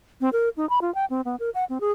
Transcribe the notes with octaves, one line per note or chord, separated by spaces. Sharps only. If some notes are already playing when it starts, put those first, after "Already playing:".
C4
A#4
D#4
B5
F4
G5
C4
B3
A#4
F#5
C4
G#4